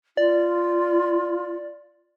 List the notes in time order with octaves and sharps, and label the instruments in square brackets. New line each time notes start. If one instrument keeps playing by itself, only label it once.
[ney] F4 [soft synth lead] D5